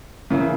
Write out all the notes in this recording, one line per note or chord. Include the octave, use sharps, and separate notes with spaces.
C#3 E3 A#3 E4